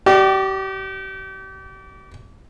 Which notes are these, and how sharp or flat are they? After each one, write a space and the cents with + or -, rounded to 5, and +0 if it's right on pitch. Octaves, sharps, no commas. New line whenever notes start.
G4 -35 D5 +20